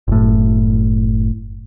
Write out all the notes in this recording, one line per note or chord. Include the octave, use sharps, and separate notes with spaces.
F#1 A2